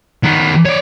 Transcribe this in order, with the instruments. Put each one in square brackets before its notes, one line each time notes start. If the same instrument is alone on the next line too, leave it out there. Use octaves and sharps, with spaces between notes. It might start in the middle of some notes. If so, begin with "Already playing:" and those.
[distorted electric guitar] D#3 B3
C#5 D5